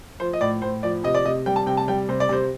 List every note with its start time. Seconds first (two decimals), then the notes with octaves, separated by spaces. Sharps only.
0.20 F3 C5
0.33 D#5
0.41 A2 D5
0.62 A2 C5
0.83 F3 D5
1.04 C3 D#5
1.15 D5
1.25 C3 D#5
1.46 G3 G5
1.56 A5
1.66 C3 G5
1.77 A5
1.88 G3 G5
2.09 C3 C5
2.20 D5
2.29 C3 C5